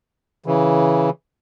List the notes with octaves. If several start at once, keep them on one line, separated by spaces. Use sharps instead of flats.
C#3 E3